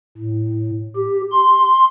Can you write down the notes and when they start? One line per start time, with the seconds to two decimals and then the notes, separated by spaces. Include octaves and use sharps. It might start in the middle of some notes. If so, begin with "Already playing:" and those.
0.17 A2
0.96 G4
1.32 C6